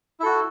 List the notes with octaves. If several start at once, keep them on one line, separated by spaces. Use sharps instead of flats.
E4 F#4 A4